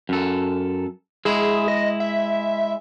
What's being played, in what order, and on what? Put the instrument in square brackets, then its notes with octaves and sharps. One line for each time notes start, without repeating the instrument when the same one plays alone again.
[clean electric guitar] F#2 A4
[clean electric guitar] G#3 E4 [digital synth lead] G#4
[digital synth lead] D#5
E5